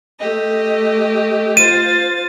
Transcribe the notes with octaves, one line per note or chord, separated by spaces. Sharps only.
A3 G4 D#5
F4 C5 A6 D#7